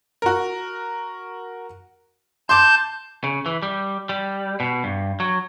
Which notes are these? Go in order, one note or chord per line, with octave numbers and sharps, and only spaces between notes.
F#4 A#4
A5 C6 D6 G6
C#3
E3
G3
G3
B2
G2
F#3